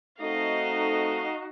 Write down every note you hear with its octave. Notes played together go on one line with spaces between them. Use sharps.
A3 C4 D#4 F#4 A4 D#5 F5